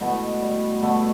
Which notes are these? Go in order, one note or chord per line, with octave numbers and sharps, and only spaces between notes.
B2 A3 B3
G3
B2 A3 B3